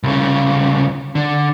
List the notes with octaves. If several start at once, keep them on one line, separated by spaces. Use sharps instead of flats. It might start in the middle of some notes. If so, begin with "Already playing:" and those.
C2 C#3
D3